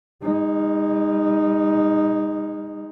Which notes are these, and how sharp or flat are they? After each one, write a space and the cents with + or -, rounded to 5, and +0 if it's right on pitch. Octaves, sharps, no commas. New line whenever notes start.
G#3 -45 D#4 +0